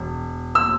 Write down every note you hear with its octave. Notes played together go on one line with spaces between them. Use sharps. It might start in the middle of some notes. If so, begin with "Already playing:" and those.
Already playing: E1
E6